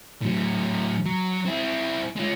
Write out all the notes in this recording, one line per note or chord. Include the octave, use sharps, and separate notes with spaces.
A2 F#3
F#3
C4 E4
G#3 F4